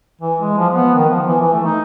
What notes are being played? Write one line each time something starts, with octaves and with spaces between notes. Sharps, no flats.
E3
G#3
F3
B3
D#3
F3
E3
E3
A3
D#4